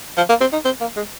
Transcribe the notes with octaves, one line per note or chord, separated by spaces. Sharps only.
F3
A#3
C4
D#4
C4
A#3
G#3